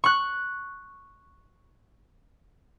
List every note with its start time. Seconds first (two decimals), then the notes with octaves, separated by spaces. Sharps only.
0.04 C#6 F#6